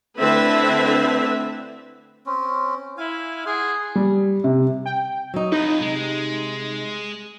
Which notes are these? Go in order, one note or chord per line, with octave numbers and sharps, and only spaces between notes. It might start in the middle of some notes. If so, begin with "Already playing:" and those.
D3 A3 C4 E4 B4 E5
C4 C#4
E4 F5 G#5
G#4 F#5 C6
G3
C3
G5
F#3 D#4
F2 D#4 B4 D#5
C3 G#3